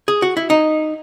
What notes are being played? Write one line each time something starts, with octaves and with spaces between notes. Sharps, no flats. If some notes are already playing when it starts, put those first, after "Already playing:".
G#4
F#4
E4
D#4